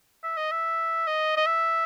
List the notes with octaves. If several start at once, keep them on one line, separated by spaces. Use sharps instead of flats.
E5
D#5
E5
D#5
D#5
E5